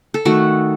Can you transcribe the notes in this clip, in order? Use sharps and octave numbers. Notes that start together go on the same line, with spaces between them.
A4
D#3 A3 F#4